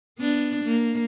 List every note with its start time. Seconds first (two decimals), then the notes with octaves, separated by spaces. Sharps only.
0.19 B3 D4
0.64 A#3